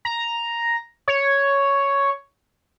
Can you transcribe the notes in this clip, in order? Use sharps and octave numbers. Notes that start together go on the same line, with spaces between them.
A#5
C#5